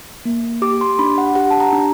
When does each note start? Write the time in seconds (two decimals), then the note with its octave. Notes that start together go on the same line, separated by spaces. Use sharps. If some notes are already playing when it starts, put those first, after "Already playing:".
0.25 A#3
0.62 G4 D6
0.81 C6
0.99 D4 B5
1.18 F#5
1.35 G4 F#5
1.50 A5
1.60 A#5
1.72 D4
1.78 A#5